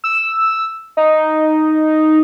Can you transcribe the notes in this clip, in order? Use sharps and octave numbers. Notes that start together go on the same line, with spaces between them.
E6
D#4